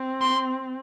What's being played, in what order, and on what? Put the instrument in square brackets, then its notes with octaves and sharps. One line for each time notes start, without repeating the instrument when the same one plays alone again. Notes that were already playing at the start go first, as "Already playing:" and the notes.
Already playing: [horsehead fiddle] C4
[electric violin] C6